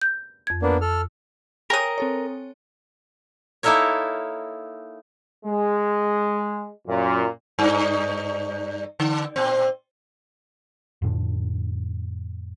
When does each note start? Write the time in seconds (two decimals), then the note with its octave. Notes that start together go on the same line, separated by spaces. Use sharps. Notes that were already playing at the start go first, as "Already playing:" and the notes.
0.02 G6
0.47 F2 G#6
0.62 A#3 B3 D4
0.81 A4 F6
1.70 A#4 C#5 G5 G#5 D#6
1.98 C4 A4 C#5
3.63 A#3 D#4 E4 A4 A#4 C#5
5.46 G#3
6.88 F#2 A#2
7.59 G2 D#4
9.00 D3
9.36 A#2 C4
11.02 F2 A2 D3